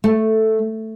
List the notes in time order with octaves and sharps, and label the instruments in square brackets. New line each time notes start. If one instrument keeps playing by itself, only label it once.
[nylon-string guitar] A3